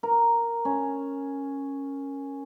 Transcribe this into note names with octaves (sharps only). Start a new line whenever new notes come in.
A#4
C#4